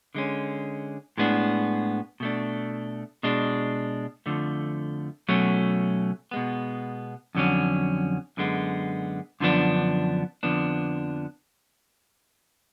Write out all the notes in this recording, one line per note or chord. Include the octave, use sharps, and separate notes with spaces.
D3 G#3 C#4
A2 G#3 B3 D4
B2 A3 D4
B2 G#3 D4
F2 D3 F3 A3
B2 F#3 A3 C#4
B2 G#3 B3
F2 D3 F#3 C#4
F#2 D3 G#3 B3
F#2 D3 F3 B3 D4
F2 D3 F3 B3 D4